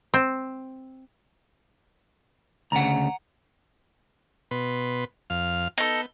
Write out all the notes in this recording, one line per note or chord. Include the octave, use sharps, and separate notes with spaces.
C4
D2 C#3 F#5 A#5
B2 B4 C6
F2 F5 F6
B3 D#4 A4